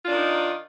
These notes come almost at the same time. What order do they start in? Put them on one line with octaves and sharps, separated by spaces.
F4 D4 D#3 D#4